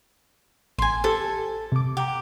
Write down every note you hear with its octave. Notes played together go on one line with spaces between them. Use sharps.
A1 G#5 C6
G4 A4 C5
C3 D6
G4 F#5 A#5